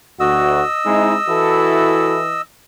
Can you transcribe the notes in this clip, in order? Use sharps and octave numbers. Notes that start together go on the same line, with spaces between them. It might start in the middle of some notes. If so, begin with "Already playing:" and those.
D2 F#4 D#5 E6
G#3 C4 D#4 E4
E3 E4 F#4 A4